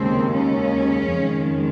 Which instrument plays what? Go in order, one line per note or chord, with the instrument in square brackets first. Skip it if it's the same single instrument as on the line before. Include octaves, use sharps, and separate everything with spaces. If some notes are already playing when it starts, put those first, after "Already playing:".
Already playing: [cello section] D#2 C#3 G#3 C4
C#3 C#4
F2 D#3 G#3